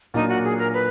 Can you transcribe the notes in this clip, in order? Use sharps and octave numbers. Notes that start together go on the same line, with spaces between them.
A#2 F#3 A#3 D4 D#4 F4
F#4
G#4
A#4
B4